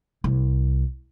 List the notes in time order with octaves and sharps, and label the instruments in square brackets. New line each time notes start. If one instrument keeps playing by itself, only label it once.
[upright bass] C2